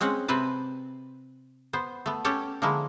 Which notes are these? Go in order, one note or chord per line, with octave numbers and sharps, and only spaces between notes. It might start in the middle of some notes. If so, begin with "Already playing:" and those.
G#3 C4 C#4 F#5
C3 C4 B4 A5
B3 C5
A3 B3
C#4 G4 A4 C#5
D3 F3 G#3 A#3 E4